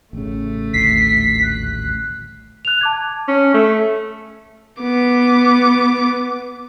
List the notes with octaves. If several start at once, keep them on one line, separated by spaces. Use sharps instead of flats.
A1 C#3 A3
D#1 A1 D2 B6 C7
F#6
F#6 F7
A5 D6 G#6
C#4
A3
B3 D6